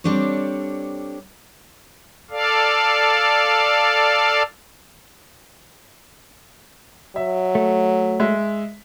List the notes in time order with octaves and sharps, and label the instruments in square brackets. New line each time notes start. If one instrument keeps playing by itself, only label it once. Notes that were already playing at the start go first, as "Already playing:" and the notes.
[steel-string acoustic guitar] G3 C4 D4 A4 C#5
[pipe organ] A4 D5 F5
[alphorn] F#3 [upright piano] E5
[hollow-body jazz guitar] A3
[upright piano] G#3 E5